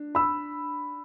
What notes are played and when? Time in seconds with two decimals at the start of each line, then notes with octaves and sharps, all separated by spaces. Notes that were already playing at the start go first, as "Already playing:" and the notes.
Already playing: D4
0.15 B5 E6